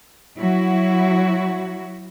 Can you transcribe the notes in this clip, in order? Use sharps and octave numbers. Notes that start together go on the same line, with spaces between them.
F#3 E4 F#4